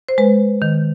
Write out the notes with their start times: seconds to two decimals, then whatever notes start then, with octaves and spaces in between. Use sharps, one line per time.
0.09 C5
0.18 G#3 B4
0.62 D#3